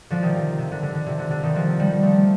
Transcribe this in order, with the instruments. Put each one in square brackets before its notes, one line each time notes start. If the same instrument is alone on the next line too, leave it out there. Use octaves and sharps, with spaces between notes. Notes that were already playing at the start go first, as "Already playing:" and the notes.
[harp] D3 F3
C3 D#3
C3
C3
D3
D3
D3
C3
D3
D3
C3 D#3
D3 F3
D#3 G3
F3 A3